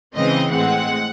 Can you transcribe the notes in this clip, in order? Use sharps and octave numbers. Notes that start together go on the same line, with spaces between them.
C#3 E3 G#3 C4 D#5
A2 G#3 C4 F#5